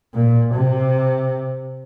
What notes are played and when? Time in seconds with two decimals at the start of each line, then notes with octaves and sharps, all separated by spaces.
0.14 A#2
0.53 C3